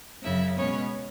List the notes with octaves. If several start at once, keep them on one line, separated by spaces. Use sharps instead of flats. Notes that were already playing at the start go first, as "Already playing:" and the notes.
F#2 C#3 F#3 E4 E5
B2 G#3 B3 C#4 C#5